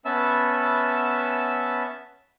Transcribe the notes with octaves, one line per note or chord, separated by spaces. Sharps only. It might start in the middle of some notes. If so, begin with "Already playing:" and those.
B3 C#4 E5 A5 B5 E6